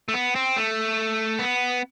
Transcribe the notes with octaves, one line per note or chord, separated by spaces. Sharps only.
A3
B3
C4
A3
B3